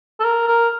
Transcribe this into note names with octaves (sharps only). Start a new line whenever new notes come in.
A4
A#4
A#4